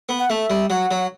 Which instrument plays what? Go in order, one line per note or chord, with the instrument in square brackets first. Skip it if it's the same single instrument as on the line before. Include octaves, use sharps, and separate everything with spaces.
[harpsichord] B3
[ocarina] F#5
[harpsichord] A3 [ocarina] E5
[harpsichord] G3
[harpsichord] F#3 [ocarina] F#5
[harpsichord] F#3